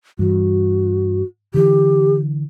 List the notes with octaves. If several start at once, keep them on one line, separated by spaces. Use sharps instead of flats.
G2 E3 F#4
D3 E3 G4